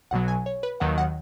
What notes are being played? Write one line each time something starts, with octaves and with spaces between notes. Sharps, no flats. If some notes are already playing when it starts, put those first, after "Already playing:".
B1 B2 F#3 F#5
G#5
C#5
B4
D#2 D#3 F#3 F#5
F#5